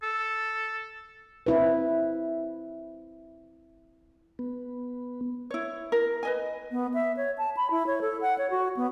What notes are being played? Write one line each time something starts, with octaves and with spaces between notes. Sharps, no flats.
A4
C4 E4 B4
B3
E4 C#5
A#4
B4 D#5 G#5
B3
E5
C#5
A5
B5
E4
C#5
A4
F#5
C#5
F#4
B3